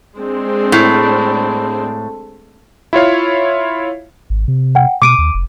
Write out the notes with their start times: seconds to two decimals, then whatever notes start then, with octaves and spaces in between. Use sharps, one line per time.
0.16 G#3 C4 D4
0.72 A2
2.93 E4 F4 C#5 F5
4.30 G#1
4.48 C3
4.75 F#5 G5
5.02 B2 D6 D7 D#7
5.18 D#2
5.34 F1